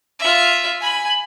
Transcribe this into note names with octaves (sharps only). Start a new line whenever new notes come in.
F4 E5
G#5 B5